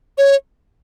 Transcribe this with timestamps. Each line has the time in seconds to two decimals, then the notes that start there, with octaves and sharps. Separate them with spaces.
0.18 C#5